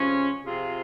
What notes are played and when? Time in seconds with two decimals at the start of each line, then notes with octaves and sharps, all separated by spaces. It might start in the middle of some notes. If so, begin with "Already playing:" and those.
Already playing: C3 F3 G#3 C#4
0.44 C3 F3 C4 F4 G#4